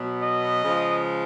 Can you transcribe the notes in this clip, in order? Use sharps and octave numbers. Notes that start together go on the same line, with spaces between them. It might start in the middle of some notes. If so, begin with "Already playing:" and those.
Already playing: B2 F#3 B3
D#5
C#3 F3 G#3